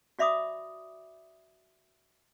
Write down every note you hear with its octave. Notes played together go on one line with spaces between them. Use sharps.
F#4 D5 E5 B5 D6 D#6